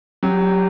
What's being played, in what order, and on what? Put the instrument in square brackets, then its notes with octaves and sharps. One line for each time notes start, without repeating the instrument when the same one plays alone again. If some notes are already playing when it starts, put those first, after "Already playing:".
[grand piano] F#3 [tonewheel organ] G4